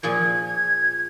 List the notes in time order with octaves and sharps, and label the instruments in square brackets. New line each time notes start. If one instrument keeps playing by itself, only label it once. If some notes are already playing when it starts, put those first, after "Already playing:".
[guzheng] A#2 F3 G#4 [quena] G#6
[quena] G#6